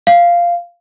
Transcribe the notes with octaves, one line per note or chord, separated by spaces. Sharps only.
F5